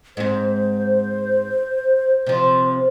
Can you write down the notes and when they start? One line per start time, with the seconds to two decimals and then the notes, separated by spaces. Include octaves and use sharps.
0.17 G#2 C4 C5
2.27 C3 F3